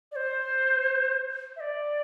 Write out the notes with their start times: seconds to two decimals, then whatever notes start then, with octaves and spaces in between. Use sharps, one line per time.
0.12 D5
0.16 C5
1.56 E5
1.60 D5